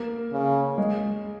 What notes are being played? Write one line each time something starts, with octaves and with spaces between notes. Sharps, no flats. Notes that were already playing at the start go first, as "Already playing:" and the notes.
Already playing: A#3
C#3
G#3